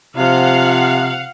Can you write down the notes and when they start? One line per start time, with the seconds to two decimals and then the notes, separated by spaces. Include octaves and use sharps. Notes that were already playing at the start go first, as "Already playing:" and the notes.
0.17 C3 F3 F5 F#5